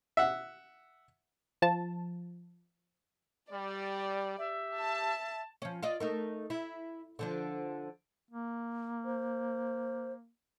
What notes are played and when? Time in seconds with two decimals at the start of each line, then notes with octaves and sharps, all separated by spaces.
0.17 E5 F#5
1.62 F3 A5
3.50 G3 D5
4.38 G4 E5
4.79 A5
5.62 F3 C#4
5.83 F4 D5 D#5
6.00 A3 D#4 A#4
6.50 E4
7.19 D3 F3 D4
8.31 A#3
9.05 C5